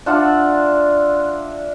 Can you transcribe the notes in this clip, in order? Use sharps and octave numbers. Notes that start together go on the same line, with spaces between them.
D4 F4 E5 F#5